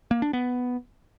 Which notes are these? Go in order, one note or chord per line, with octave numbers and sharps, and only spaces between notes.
A#3
D4
B3